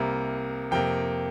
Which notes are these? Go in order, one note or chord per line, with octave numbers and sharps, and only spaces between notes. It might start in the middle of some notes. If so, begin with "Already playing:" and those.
Already playing: C2 C3 A#3 A#5
F2 C3 A#3 G5